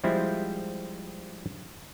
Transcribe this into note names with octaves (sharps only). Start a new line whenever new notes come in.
F3 G3 G#3 C4 E4